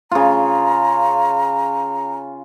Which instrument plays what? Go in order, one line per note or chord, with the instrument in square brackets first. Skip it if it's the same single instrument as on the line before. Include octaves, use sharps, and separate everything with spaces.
[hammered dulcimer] C#3 F4 [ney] A#5